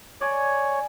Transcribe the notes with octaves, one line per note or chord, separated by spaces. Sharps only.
C#5 D5 G#5